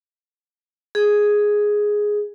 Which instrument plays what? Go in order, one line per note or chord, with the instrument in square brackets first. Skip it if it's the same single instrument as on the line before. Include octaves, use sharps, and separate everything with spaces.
[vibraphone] G#4